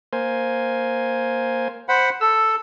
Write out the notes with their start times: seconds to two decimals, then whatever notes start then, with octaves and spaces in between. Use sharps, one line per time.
0.13 A#3 C5 G#5
1.89 C5 F#5 B5
2.21 A4 E6